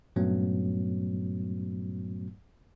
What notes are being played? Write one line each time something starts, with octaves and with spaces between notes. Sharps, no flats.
G2 A#2 F#3 A3 B3 C#4